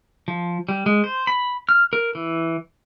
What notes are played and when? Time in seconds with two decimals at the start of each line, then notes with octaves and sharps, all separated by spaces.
0.28 F3
0.69 G3
0.86 G#3
1.04 C5
1.27 B5
1.69 F6
1.93 A#4
2.15 E3